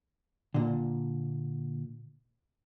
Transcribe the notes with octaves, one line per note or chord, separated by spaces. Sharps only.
A#2 D3